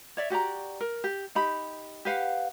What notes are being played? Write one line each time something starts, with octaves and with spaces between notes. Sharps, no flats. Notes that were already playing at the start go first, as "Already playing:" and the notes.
C#5 D5 E5
F#4 G4 D5 A#5
A#4
G4
D#4 G4 B5
G4 B4 F5 F#5